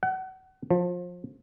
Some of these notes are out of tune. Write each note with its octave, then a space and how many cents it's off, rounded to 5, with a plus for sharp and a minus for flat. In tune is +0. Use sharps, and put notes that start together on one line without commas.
F#5 +30
F3 +25